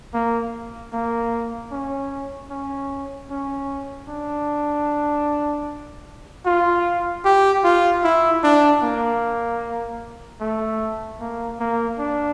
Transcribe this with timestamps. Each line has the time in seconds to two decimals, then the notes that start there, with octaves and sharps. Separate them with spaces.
0.14 A#3
0.93 A#3
1.72 C#4
2.50 C#4
3.30 C#4
4.09 D4
6.46 F4
7.25 G4
7.64 F4
8.04 E4
8.43 D4
8.83 A#3
10.41 A3
11.20 A#3
11.60 A#3
11.99 D4